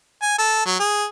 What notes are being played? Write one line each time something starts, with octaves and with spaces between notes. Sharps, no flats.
G#5
A4
F#3
G#4